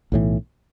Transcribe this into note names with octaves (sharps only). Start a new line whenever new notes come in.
B1 A2 E3